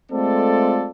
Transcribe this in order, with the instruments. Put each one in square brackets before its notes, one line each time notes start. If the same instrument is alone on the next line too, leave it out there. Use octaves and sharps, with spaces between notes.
[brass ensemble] G#3 A3 C4 F4 A4 D5